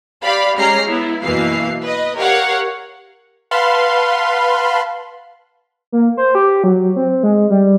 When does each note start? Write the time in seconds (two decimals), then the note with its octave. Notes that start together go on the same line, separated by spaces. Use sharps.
0.23 G4 D5 F5 B5
0.57 G#3 C#4 G4 A#5 F6 C7
0.86 B3 E4
1.23 F#2 B2 E3 A#3 F5 C7
1.82 B4 D#5
2.16 G4 A#4 C#5 F5 F#5
3.51 B4 F5 F#5 A5 B5 C6
5.92 A#3
6.17 C5
6.35 G4
6.64 F#3
6.96 C4
7.23 G#3
7.50 G3